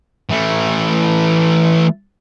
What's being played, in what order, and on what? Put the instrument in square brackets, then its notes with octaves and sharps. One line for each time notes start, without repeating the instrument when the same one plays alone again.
[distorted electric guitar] E3 A3